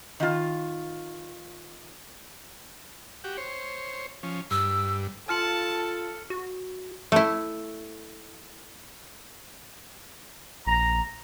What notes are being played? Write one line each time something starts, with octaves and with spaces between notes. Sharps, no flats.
D#3 F4
F#4 G4
C5 C#5
F3 C#4
G2 E6
F4 A4 A5 F6 C#7 F#7
F#4
A3 E4
A#1 A#5